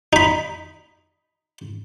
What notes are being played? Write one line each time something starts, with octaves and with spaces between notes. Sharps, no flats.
D#4 B5